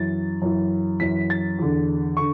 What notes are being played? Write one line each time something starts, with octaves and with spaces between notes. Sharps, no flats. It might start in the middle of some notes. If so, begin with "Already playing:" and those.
Already playing: F#2 E3 A6
F#2 E3
F#2 E3 B6
A6
E2 D3
D3 C#6